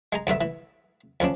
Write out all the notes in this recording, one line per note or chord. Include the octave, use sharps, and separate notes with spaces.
G#3 G#5 A#5
D2 G2 D3 E5
E3
D2 F3 C#4 D4